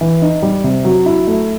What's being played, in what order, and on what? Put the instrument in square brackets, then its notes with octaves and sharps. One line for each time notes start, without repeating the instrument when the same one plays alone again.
[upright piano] E3
D#4
G3
C3
F#3
E4
A3